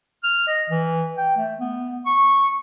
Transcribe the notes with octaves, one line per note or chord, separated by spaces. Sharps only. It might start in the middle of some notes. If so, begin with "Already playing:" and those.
F6
D#5
E3
G5
A3
B3
C#6